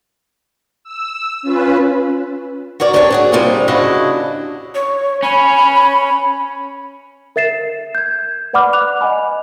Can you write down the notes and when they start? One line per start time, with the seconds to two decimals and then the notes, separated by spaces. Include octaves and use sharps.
0.84 E6
1.42 C#4 F4 B4
2.80 F#4 A#4 C#5 D5
2.93 C4 D4 D#4 G4 A#4 C#5
3.10 D4 F#4 G#4
3.32 G#2 C3 G3 D#4 F4 G#4
3.68 D#2 C#3 D4 E4 F#4 D#5
4.75 C#5
5.23 C#4 B5
7.36 A#4 E5 A6 C7 E7
7.95 G6 G#6
8.53 B4 D5 F#5 B5 D6 F6
8.73 D6 F#6 F7
9.01 D#5 F#5 G#5 B5